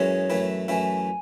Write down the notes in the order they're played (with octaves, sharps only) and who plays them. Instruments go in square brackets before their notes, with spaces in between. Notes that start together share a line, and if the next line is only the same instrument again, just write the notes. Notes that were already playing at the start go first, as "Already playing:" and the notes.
Already playing: [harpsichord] F#2 E3 G#3 C#4 [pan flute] C#5
[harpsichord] F#2 E3 A3 E4
[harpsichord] F#2 E3 A3 E4 [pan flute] G#5